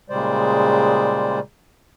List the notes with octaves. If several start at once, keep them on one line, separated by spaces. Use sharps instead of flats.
A#2 C#3 G3 G#3 C5 D5